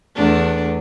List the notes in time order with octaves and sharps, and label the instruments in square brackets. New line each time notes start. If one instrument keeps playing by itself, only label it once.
[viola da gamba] E2 A3 D4